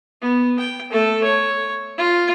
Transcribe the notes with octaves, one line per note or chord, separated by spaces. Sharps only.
B3
G5
A3 A4
C#5
F4